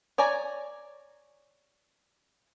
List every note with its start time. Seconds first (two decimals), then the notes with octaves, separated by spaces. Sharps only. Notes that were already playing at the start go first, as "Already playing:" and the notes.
0.18 C#5 D5 G#5 A#5